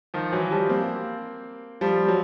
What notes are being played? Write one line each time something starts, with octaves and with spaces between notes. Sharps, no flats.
D#3 F3
E3 F#3
F3 G3
A#3 C4
F3 G3
F#3